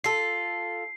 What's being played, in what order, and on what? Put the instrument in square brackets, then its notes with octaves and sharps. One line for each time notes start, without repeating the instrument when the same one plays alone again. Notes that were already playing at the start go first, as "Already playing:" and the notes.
[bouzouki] F4 A4 [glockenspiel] C7